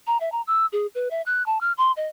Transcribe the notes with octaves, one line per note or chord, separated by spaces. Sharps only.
A#5
E5
A#5
E6
G#4
B4
E5
F#6
A5
F6
C6
D#5